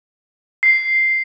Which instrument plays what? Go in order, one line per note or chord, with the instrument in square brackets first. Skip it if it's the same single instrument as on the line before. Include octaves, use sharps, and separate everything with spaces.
[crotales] C7